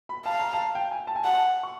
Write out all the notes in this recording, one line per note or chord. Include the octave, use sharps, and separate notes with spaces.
B5
F5 A5
A#5
A5
G5
G#5
A5
G#5
F#5 A5
C#6